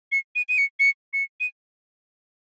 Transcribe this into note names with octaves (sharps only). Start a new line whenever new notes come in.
C#7
D#7
D#7
C#7
C#7
C#7
D#7